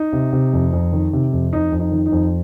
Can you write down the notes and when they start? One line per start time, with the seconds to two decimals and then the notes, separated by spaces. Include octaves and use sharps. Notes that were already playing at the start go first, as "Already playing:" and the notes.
Already playing: D#4
0.13 C3
0.33 C3
0.53 F2
0.73 F2
0.93 D#3
1.13 C3
1.33 F2
1.53 F2 D#4
1.72 F2
1.79 D#4
1.92 D#3
2.06 D#4
2.12 F2